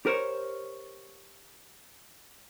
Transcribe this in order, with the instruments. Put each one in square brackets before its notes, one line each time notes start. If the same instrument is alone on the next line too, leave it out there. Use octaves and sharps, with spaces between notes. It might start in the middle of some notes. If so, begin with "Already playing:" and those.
[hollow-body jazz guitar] G4 A#4 C5 C#5